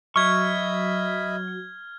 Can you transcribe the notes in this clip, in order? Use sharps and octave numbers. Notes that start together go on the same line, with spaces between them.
F#3 D#5 E5 B5 C#6 F6 G#6